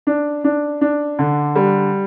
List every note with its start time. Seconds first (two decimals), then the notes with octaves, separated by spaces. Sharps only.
0.07 D4
0.44 D4
0.81 D4
1.19 D3
1.56 G3